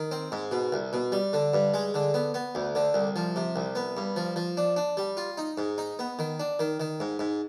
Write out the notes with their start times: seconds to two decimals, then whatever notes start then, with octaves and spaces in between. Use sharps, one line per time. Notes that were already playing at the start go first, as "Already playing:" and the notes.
Already playing: D#3
0.11 C4
0.32 G#2
0.51 B2
0.72 C2
0.93 B2
1.12 G3
1.33 D3
1.54 G2
1.74 G#3
1.94 D3
2.14 B3
2.34 B3
2.55 D2
2.75 D3
2.94 C2
3.16 F3
3.36 C3
3.56 C2
3.75 B3
3.97 G2
4.16 F3
4.36 F3
4.57 D4
4.76 D4
4.97 G3
5.17 F4
5.38 D#4
5.58 G#2
5.78 D#4
5.99 B3
6.19 D#3
6.40 D4
6.59 D#3
6.80 D#3
7.00 G#2
7.19 G#2